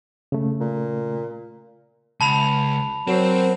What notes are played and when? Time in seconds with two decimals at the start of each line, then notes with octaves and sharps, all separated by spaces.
0.32 C#3 A3
0.60 A#2
2.21 C#2 A5 B5 F7
3.08 F#3 C4 A#4 C5